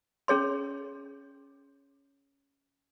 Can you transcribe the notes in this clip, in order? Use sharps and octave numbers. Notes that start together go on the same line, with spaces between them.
C#4 G#4 C#5 C6